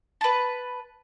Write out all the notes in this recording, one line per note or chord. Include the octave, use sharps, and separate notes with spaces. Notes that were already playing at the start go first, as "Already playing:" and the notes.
B4 A5